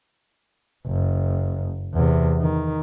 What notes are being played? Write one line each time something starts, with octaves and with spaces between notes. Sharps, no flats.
F#1
E2 C3
D#3